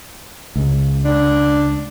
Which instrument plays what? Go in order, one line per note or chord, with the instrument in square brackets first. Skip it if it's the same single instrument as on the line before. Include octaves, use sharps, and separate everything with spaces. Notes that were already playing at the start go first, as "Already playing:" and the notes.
[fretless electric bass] C#2
[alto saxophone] D4